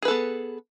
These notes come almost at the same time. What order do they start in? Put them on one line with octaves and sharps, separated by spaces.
G#4 B4 A4 B3